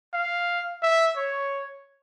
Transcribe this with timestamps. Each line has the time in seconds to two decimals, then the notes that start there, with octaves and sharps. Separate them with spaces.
0.14 F5
0.83 E5
1.17 C#5